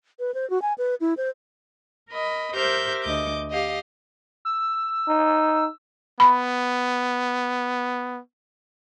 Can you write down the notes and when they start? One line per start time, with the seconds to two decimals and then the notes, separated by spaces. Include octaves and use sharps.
0.19 B4
0.34 C5
0.50 F#4
0.62 G#5
0.78 B4
1.01 E4
1.17 C5
2.10 A#4 D#5 B5
2.54 G4 A#4 C5 E5 F6 G6
3.04 D2 D#5 D6 G6
3.49 G4 D#5 F5
4.45 E6
5.08 D#4
6.20 B3 B5